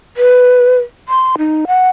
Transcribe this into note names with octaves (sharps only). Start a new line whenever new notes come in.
B4
C6
D#4
F#5